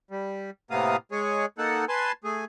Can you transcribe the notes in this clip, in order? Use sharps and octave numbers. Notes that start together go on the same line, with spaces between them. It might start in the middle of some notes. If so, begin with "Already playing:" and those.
G3
A2 C3 A#3 B3 F5 D#6
G#3 G#4 C#5
A#3 D#4 A4 F#5
B4 G#5 A5 C6
A3 G#4